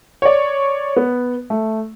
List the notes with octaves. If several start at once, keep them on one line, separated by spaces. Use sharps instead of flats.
C#5 D5
B3
A3